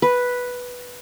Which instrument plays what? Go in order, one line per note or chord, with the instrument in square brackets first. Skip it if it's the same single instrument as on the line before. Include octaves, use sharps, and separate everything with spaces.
[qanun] B4